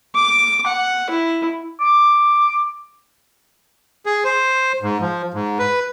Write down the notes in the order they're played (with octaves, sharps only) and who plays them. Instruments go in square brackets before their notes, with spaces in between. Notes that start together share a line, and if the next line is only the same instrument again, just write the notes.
[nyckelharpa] D6
F#5
E4
[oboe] D6
[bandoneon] G#4
C5
G#2
F3
G#2
B4